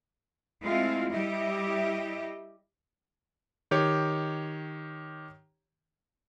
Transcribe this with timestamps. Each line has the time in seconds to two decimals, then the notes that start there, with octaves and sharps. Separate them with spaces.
0.62 G#3 A3 C4 E4 F4
1.11 G3 E4 G4 D#5 E5
3.71 D#3 G4 C#5